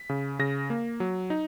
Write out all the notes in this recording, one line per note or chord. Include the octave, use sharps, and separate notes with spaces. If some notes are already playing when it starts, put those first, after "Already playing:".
Already playing: B6
C#3
C#3 A#6
A#3
F#3
D#4